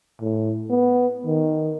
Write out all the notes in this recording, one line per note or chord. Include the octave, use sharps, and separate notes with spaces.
A2
B3
D#3